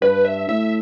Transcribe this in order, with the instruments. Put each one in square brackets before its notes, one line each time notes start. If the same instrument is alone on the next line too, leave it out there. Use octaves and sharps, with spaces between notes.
[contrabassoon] G2 [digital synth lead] B4
[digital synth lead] E5
[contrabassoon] A2 [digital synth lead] E5